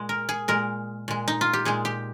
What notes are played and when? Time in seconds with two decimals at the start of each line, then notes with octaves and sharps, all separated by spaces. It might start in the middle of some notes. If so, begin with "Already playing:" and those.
Already playing: A#2 G#3
0.09 A#4
0.29 G#4
0.48 A#2 G#3 A#4
1.08 A#2 G#3
1.28 D#4
1.41 F4
1.53 G4
1.65 A#2 G#3 G#4
1.85 G4